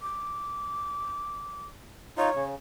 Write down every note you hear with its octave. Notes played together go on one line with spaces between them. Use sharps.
D6
D#4 F4 C#5
C#3